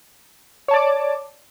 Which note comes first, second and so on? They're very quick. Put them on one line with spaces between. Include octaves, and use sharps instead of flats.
C#5 A5 D5 D6